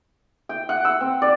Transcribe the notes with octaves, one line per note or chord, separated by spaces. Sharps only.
G5
F#5
E6
C4
D5